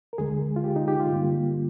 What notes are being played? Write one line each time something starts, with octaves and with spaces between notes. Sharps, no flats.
A#4
D2 D3 G#3 G#4
F4
G4
D#4
G4
F4
G2 D3 G3 A#3